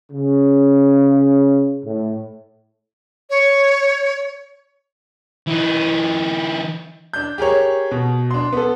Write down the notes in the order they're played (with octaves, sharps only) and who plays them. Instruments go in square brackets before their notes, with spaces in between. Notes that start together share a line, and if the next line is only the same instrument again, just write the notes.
[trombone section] C#3
A2
[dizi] C#5
[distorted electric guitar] E3 D#4
[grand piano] D4 G6
G4 G#4 A#4 C#5
B2
D4 C6
B3 A4